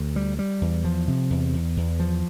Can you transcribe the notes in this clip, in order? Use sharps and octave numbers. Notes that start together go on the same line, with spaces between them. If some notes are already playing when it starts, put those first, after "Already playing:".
Already playing: D2
G3
G3
E2
F3
C3
E2
E2
E2
F3